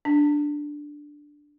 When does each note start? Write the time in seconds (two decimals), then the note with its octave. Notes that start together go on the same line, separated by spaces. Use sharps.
0.05 D4